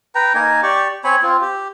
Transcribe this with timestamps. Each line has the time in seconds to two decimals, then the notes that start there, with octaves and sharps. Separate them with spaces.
0.15 B4 G5 A#5
0.35 A#3 D#4 A#4 G#5
0.63 G4 D5 C#6
1.04 C4 C#5 G#5 B5
1.22 C4 F4
1.41 G4